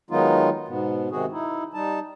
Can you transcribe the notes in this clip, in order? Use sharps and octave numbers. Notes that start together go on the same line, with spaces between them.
D#3 F#3 G#3 B3 D#4 F4
G#2 B2 B3
C3 D#3 G#3 C4 F#4 G#4
D#4 E4
G3 D#4 A5